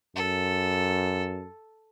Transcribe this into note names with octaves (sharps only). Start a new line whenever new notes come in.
F#2 A4